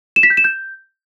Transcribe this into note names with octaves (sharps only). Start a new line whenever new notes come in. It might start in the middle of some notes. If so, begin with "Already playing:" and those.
E7
B6
G6
E7
G6